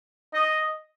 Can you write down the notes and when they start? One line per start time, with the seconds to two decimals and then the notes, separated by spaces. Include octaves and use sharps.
0.34 D#5